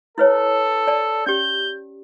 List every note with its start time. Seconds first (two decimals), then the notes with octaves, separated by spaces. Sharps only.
0.18 E4 A4 B4 C#5
0.87 D5 A5
1.26 C#4 G4 G6